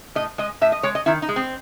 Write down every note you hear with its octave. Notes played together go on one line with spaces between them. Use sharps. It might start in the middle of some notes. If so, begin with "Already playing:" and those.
A2 D#5
G#3 D#5
A2 E5
D#5
G#3 C#5
D#5
D#3 E4
D#4
G#3
C4